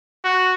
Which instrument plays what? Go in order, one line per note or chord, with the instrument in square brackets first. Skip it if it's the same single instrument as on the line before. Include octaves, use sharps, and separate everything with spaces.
[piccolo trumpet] F#4